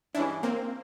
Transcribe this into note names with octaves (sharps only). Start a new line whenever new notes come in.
G2 E3 G#3 C#4 D4 E4
A#3 C4